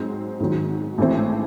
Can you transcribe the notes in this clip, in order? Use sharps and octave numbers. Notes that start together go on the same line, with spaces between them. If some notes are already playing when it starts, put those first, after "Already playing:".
Already playing: G#2 F#3 C4
G#2 D#3 F#3
A1 G#2 E3 A3 C4